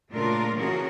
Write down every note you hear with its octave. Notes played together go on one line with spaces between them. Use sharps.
A#2 C#3 A3 D4 F4 A#4
C#3 E3 C#4 F#4 G#4 A#4